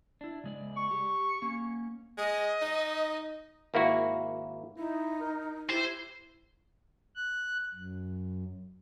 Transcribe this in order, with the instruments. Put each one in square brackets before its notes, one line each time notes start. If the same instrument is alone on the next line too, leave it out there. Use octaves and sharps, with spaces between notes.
[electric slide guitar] D4 E4
C#3 G#3 D5
[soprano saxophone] C#6
[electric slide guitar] G4
A#3 C#4
[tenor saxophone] G#3 [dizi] D#5
[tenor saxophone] D#4
[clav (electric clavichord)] G#1 A#3 E4 F#4
[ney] D#4 [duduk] E4
[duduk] A#4
[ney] E4 [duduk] G4 [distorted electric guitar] C5
[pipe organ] F#6
F#2